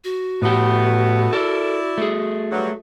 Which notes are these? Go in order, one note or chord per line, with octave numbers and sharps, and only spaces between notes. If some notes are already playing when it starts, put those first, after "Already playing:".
F#4
A2 A3 B3 G4
E4 A4 A#4 D5
A3 G#4
G2 F#3